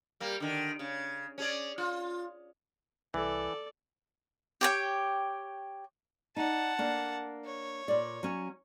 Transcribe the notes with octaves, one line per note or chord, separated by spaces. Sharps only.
G3 A#3
D3 D#3
C#3
C#4 G#4 D5
F4
C2 E3 A4 D5
G4 C#5 G5
D#4 D5 F#5 A5
A#3 D4
C#5
A#2 D5
F#3 C#4